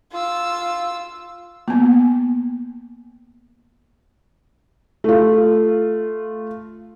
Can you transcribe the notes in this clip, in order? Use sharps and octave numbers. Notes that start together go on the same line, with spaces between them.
F4 E6
A#3 B3
A3 F4